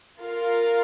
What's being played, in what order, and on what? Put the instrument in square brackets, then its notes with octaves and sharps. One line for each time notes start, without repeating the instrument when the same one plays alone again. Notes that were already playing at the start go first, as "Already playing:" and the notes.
[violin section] F4 A#4 F5